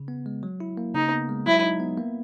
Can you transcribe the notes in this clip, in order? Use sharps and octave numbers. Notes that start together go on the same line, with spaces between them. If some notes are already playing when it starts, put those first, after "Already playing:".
Already playing: C#3
B3
G#3
F#3
E4
A#3
C#3 D#4
B3
G#3
F#3 E4
D#4
B3
A#3